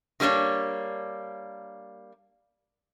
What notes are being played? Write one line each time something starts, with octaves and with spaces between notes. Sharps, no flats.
D#3 G3 A#3 D4 C#5